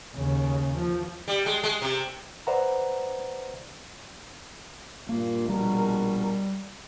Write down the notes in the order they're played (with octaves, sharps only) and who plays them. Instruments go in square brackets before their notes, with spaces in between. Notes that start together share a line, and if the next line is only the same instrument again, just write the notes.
[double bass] D#2 C#3
F3
[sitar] G3
G#3
G#3
C3
[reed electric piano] B4 C5 D5 E5 F#5 A#5
[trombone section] G2 A#2 [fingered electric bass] A#3
[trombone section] A#1 B2 A#4 [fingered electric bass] G3